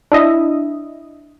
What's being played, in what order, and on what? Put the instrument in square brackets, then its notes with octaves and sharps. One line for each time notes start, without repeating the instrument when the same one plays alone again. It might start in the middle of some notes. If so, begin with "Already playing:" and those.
[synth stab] D4 E4 D#5 E5